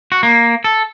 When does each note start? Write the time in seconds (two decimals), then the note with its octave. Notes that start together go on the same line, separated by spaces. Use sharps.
0.12 F#4
0.23 A#3
0.64 A4